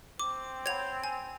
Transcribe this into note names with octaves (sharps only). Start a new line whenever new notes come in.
C4 D6
C#5 F#5 B5 G#6 F7
G#5